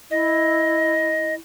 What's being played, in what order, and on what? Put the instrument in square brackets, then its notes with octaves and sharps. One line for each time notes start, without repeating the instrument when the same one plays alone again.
[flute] E4 [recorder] D#5